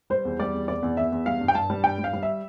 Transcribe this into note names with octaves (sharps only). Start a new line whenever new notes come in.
G3 C5
E2
G3 D5
E2
E2 D5
E2
E2 E5
E2
G3 F5
G2
G5
G2 A5
G3
G2 G5
G3
F5
G3
E5